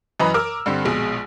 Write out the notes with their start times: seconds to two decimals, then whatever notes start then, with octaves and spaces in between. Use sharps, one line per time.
0.20 F#2 E3 B4 D#5 A#5 B5
0.34 A#4 D6 E6 F6
0.66 G2 D3 C4
0.85 A#1 B2 G#3